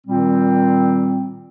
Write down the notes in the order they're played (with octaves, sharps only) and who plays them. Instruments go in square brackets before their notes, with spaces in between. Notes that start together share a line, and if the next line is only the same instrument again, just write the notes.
[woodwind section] A#2 D#3 G3 C4